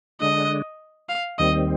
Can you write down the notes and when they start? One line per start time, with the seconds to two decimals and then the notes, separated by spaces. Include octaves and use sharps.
0.20 D3 G#3 D4 D#5
1.09 F5
1.39 D#2 D#3 G3 C4 D#5